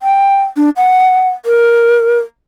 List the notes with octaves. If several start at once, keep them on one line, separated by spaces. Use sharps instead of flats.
G5
D4
F#5
A#4